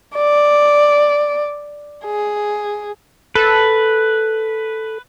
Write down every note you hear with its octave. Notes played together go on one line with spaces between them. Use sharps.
D5
G#4
A4 B4